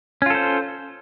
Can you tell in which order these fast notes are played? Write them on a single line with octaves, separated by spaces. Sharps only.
C#4 F4 A4 C5